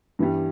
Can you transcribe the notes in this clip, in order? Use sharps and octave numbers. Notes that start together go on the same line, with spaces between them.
G2 E3 G3